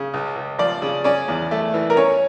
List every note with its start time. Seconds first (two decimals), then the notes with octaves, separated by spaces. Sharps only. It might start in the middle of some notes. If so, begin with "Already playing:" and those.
Already playing: C#3
0.14 C#2
0.36 C#2
0.59 F3 D5
0.82 C#3
1.04 C#4 D5
1.28 E2
1.51 A3
1.74 E3
1.90 A#4
1.96 C#4 C#5